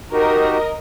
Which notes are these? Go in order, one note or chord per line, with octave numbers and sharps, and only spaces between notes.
D#4 F#4 G4 A#4 D#5